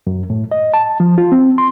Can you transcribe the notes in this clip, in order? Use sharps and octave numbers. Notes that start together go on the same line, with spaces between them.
F#2
A2
D#5
A5
F3
F4
C4
C6